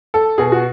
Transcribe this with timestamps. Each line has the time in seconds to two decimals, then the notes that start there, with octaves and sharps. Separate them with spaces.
0.14 A4
0.38 B2 G#4
0.52 F#4